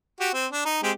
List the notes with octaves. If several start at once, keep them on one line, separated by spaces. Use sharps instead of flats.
F#4 G4
C4
D4
D#4
G#3 C4 G4